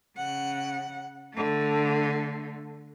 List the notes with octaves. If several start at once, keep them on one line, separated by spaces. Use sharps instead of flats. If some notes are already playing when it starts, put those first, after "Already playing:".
C#3 F#5
D3 A3